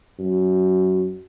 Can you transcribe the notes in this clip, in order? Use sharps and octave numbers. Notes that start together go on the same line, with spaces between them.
F#2